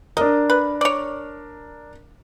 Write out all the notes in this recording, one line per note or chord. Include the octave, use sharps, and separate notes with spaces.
D4 A#4 D#5
B4
C#5 D5